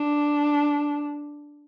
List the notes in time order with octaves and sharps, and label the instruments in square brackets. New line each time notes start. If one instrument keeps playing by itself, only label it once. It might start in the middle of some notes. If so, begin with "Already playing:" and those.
Already playing: [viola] D4